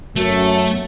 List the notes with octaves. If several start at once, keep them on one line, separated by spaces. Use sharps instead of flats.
F#2 F#3 A3